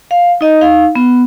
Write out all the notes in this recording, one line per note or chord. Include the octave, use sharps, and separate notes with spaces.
F5
D#4 D#5
D#4 F5
B3